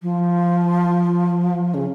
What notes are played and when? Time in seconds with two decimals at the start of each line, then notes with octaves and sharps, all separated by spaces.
0.02 F3
1.74 C#3